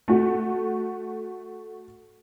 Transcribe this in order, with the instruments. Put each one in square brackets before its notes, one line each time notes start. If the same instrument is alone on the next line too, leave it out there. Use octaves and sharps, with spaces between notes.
[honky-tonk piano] A3 F#4